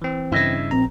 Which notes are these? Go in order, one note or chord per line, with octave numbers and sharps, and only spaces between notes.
E3 C4
G2 C#3 E4 D#5
A#1 C4 A#5